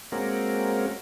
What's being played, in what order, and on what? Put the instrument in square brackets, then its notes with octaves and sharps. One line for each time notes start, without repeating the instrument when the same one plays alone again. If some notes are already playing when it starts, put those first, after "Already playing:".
[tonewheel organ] G#3 A#3 C4 C#4 F#4 A#4